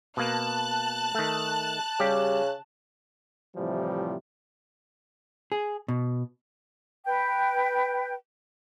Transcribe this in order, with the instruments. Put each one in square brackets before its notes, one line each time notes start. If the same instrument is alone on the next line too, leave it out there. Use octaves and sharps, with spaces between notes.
[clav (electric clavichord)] B2 A#3 [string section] A5 F#6
[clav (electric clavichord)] D#3 A3
[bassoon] C#3 [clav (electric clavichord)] G3 G4
[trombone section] A2 C3 E3 F3 G3
[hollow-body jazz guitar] G#4
B2
[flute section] B4 G5